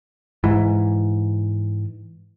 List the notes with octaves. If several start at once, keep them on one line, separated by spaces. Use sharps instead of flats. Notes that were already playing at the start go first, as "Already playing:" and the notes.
G#2 E3